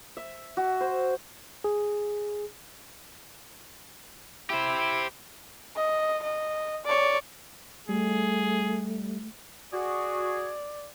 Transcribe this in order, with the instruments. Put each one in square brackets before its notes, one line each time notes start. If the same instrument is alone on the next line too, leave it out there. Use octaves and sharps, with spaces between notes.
[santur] E5
F#4
C5
[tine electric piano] G#4
[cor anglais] E4 [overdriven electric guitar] G4 C5
[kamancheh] D#5
D#5
C#5 D5
[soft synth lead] G3 [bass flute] A3 [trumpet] G#4
[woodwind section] F#4 G#4 [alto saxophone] D5